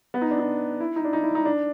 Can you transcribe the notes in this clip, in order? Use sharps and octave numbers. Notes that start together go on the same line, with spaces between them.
B3
D#4
D4
D#4
E4
D#4
D4
D#4
E4
D#4
D4